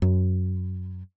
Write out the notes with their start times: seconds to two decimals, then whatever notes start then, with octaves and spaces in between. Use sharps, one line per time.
0.02 F#2